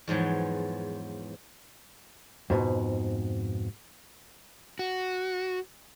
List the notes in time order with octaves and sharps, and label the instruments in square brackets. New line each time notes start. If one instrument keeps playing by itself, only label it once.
[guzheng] E2 G#2 F3 F#3
[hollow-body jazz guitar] F2 G#2 B2
[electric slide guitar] F#4